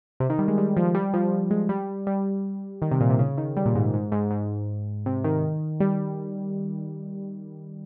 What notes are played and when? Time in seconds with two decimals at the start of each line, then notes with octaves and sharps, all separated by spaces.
0.20 C3
0.30 D#3
0.39 G3
0.48 G#3
0.58 G3
0.77 F3
0.95 G3
1.14 F3
1.51 G#3
1.69 G3
2.07 G3
2.82 D#3
2.91 C3
3.01 A#2
3.09 C3
3.19 C#3
3.38 D#3
3.57 G3
3.66 A#2
3.75 G#2
3.93 G#2
4.12 G#2
4.31 G#2
5.06 C3
5.24 D#3
5.80 G3